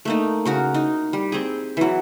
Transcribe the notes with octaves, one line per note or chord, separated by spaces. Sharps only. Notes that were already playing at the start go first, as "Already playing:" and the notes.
A3 A#3 D#4
C#3 F#4 A#4
D#4
G3
C4 G#4
E3 F#3